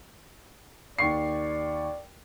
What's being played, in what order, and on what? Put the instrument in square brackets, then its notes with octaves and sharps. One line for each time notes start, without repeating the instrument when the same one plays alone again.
[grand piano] D#2 C#6 C7 [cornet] D5